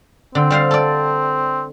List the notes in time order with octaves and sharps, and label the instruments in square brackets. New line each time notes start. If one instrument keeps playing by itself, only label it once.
[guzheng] D3 [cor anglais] C4
[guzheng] G3 C5 F5
A4 D5